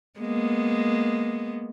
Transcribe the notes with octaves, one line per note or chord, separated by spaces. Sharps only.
G#3 A#3 B3